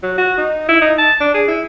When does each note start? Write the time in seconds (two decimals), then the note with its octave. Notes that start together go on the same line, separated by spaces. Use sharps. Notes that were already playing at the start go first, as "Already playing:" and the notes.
0.03 F#3
0.18 F#4
0.37 D#4
0.68 E4
0.81 D#4
0.98 A5
1.20 D4
1.34 G#4
1.48 E4